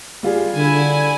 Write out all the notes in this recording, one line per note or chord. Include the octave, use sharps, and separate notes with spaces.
G3 F4 G#4
D3 E4 G#5